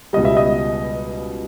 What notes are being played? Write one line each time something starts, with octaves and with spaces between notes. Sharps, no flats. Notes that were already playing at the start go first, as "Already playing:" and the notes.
C#2 B2 G3 D#5
E5
D#5